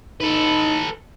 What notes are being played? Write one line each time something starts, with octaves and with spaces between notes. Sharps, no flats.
D#4 A4 B4